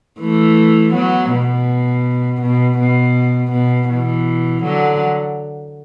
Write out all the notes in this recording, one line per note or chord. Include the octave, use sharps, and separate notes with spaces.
E3 A3
F#3 B3
B2
B2
B2
B2
B2 E3
D3 F#3